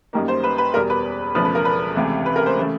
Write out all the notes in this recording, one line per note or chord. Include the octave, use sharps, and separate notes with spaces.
F#2 D#3 G3 A#3
C5
B4
B4
E2 B2 G3 A#4
B4
E1 E2 C#3 F3 A3 B4
B4
A#4
B4
C#2 C3 E3 A3
B4
A#4
C5
C#3 E3 A3